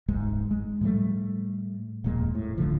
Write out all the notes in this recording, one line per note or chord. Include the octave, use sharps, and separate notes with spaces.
D1 G1 G#2 G#3
G#3
A2 F3 G3 A3
D#1 F2 A#2 G#3
A2
D1 A1 D3 F3